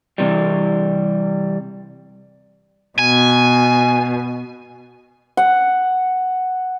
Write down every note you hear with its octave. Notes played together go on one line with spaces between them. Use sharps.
C3 E3 G3
B2 G#5
F#5